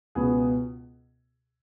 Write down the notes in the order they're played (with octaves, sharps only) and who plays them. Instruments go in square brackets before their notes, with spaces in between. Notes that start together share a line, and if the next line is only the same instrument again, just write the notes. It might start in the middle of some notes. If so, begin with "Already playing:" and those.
[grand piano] C#2 B2 B3 G#4